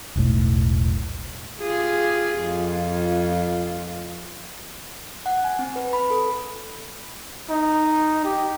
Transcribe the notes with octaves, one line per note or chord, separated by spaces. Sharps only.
E1 B1 A2
F4 G4 G#4
F2 F4
F#5
G#5
C4
B4
B5
A4
D#4
G4